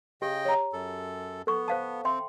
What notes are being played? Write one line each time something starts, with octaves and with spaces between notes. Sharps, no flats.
C#3 G4 D#5 G5
C#5 A#5
F#2 A4
B3 A4 C#6
C5 F5 A5
C4 E5 G5 C6